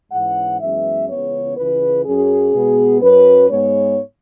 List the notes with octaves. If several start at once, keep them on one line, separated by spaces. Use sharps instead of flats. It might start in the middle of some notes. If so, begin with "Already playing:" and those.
G#2 E3 C#4 F#5
F#2 E3 G#3 B3 E5
C#2 C#3 E3 B3 C#5
C#2 C#3 E3 B4
F#2 F#3 C#4 G#4
B2 G#3 B3
F#2 F#3 C#4 B4
G#2 G#3 B3 C#5